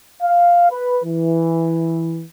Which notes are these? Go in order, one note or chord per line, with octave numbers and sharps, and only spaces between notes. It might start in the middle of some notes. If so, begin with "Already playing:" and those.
F5
B4
E3